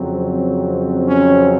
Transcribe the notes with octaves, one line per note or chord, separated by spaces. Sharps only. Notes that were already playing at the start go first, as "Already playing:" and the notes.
Already playing: F2 C#3 F#3 C4
C#4